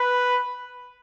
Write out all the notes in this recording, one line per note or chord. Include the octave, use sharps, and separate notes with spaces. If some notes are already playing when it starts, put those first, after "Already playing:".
Already playing: B4